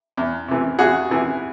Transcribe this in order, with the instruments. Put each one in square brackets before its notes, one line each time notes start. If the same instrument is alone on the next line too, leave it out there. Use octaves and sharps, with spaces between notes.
[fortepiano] E2
C3 E3
E2 F#4 G#4
C3 E3